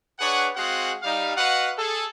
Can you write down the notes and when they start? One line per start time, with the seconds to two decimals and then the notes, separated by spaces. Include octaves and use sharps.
0.19 D4 G#4 B4 C#5 F#5
0.56 G#3 C4 F#4 G#4 F5 F#5
1.03 G3 D#4 F5
1.36 F#4 B4 D#5 F5 F#5
1.76 G#4 A4